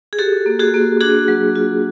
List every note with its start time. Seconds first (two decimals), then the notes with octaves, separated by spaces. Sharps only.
0.13 G#4
0.19 F#4 G4 A4
0.46 A#3
0.59 F#4 G#4
0.74 A#3
1.01 D4 F#4 G#4
1.28 F#3
1.56 F4